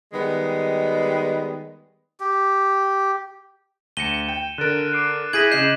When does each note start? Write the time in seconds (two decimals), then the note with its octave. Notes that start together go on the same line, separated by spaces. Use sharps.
0.13 D#3 G3 G#3 B3
2.20 G4
3.97 D2 A#6 C#7 D#7 E7 G7
4.29 G5
4.58 D3 A#4 F#6 A6 D7
4.92 D6 C7 D7
5.33 E4 G#4 G6 G#6 A#6 B6 D#7 F#7
5.51 C#3 D#5 G6 C7 E7